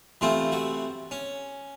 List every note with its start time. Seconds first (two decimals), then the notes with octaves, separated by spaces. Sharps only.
0.21 C3 E3 A3 C4 F4
0.52 F#4
1.11 C#4